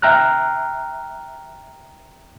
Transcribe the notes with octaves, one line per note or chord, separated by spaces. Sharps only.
E5 G5 A#5 F6 F#6